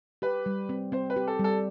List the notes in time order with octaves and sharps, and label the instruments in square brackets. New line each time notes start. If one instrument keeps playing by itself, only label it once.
[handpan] G4 [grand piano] B4
[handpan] G3
C4
[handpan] C4 [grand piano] C5
[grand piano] B4
[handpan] G4
[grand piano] A4
[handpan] G3 [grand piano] A4